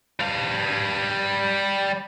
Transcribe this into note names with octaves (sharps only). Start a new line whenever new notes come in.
G3 F5